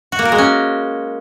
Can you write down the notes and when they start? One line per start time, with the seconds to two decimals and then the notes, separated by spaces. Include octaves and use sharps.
0.12 F#4
0.19 A#3
0.25 A#4
0.32 G#3
0.38 C#4